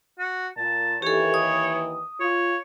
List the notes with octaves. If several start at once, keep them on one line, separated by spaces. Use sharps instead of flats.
F#4
A#2 A5
D#2 E3 G4 A4 C#5
D#6
F4 C#5